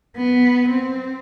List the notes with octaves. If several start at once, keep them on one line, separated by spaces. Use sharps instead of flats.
B3
C4